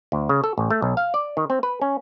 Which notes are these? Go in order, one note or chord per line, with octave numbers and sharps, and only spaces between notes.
D2
C#3
A4
A1
A3
B1
F5
D5
D#3
C4
B4
C#4